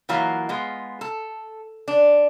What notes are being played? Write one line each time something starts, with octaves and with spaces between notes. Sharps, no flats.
E3 F#3 A#3 F4
G#3 B3 F4
A4
D4